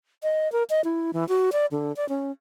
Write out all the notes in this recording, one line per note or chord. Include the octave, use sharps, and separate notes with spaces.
D#5
A#4
D#5
E4
E3
F#4
D5
D3
D5
C#4